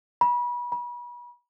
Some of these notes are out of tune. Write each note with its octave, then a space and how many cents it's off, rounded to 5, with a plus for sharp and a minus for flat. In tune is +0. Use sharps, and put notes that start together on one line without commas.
B5 -30
B5 -35